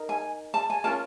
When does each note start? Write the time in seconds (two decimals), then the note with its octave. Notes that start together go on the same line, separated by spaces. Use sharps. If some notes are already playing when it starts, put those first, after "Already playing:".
Already playing: D#4 A#4
0.09 G#5
0.54 A5
0.70 G#5
0.84 C#4 F4 A#4 A5